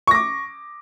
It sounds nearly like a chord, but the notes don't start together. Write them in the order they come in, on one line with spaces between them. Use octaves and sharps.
C#6 A#6 D6